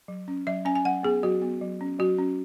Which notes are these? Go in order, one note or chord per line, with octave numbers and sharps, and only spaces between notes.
F#3
C#4
F#3 E5
C#4 G#5
G#5
F#3 F#5
B3 G#4
F#3 F#4
B3
F#3
C#4
F#3 F#4
C#4